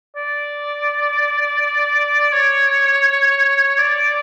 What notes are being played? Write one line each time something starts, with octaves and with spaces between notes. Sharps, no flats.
D5
C#5
D5